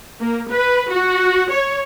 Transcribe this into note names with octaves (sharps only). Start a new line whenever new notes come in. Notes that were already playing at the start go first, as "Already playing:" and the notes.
A#3
B4
F#4
C#5